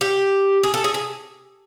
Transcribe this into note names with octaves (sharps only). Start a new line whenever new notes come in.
G4
G#4
A4
G#4
G#4